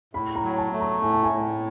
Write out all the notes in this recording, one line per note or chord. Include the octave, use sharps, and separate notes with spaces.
A2 B5
A#5
F#3
A5
A3
A#5
A2 G#5
A5
G#5
A2